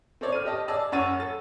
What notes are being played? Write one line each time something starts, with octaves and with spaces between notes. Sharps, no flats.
C4 A4 C#5 D5
F6 D#7
G4 D#5 A5
G#4 D5 A5 E6
F#2 C#5 F#5 E6 A6 D#7
A4 A6